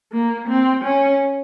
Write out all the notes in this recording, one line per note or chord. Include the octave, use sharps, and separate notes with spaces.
A#3
C4
C#4